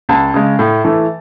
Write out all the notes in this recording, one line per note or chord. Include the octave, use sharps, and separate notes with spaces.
C#2 A5
C#3 G#3
A2
E3 A3